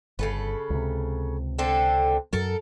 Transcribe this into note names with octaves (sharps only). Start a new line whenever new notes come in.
G1 C#3 A4 B4
C#2 C3
D3 C4 A4
F#2 F#3 A4 A#4